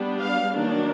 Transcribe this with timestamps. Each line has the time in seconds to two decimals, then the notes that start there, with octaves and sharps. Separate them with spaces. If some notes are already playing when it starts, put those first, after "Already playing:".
Already playing: G3 B3 D4
0.22 F5
0.56 D#3 F#3 A#3 D4